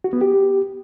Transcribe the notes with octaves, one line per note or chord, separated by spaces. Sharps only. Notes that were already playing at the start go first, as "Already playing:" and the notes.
F#4
B3
G4